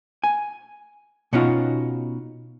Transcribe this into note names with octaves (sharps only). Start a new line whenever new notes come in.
G#5
B2 B3 C#4 D#4 F4 F#4